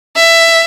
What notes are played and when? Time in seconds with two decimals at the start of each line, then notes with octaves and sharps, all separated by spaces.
0.16 E5